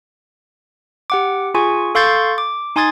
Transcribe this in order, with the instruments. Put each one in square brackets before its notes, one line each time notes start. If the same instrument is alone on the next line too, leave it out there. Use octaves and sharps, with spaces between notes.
[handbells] G4 F#5 D6
F4 G#4 G#5 C#6
A4 F5 C6 C#6 G6 A6
D6
D#4 G#5 C6 D#6 G#6 A6